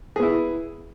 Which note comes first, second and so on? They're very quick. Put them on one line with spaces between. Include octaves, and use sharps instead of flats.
G#4 B3 E4